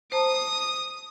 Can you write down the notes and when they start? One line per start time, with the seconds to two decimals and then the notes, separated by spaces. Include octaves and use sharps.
0.12 C5 A5 A#5 D#6